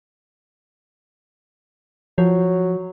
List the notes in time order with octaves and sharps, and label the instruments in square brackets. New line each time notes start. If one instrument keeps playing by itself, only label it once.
[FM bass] F3 [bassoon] F#3